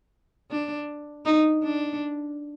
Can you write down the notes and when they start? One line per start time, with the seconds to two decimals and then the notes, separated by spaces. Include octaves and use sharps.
0.51 D4
1.25 D#4
1.63 D4